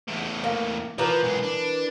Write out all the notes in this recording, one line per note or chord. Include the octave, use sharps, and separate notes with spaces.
E2 A2
A#3
E3 F3 A#4 B4
B1 G#3
D4